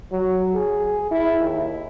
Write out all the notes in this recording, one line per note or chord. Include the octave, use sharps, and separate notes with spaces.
F#3
G#4
E4
D#2